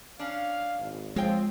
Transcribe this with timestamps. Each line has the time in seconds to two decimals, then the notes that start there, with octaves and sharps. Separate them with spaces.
0.20 C#4 D4 F5
0.79 G#1
1.16 F3 G#3 C4 C#5 F5 G5